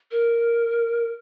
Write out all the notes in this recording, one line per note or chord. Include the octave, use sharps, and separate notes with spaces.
A#4